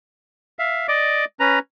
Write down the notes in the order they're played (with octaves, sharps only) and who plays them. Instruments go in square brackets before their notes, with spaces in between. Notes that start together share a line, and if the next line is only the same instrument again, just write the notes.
[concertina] E5 F5
D5 D#5 D6
C#4 B4 A#5